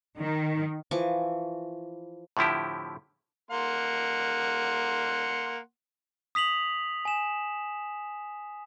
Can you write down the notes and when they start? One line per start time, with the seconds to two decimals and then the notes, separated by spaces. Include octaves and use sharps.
0.20 D#3
0.91 E3 F3 C#6 D6
2.37 A2 D3 F3 E4 G4
3.51 A#3 F#5 C6
6.35 D#6 B6 F7 F#7
7.05 G#5 E7